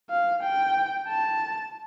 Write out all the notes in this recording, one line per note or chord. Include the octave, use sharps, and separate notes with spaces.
F5
G5
A5